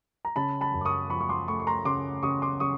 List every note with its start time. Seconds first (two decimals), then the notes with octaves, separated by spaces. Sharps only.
0.25 A#5
0.36 C#3 A5 B5
0.61 A5 B5
0.74 F#2
0.81 D6
0.85 C#6 D#6
1.10 F3 B5 C#6
1.20 C#6
1.29 C6 D6
1.48 A3 B5 C#6
1.60 C#6
1.67 A#5 C6
1.85 C#3 C6 D6
2.23 C#3 C#6 D#6
2.42 C6 D6
2.60 C#3 C#6 D#6